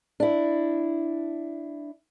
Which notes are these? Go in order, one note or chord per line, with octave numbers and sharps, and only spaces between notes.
D4 E4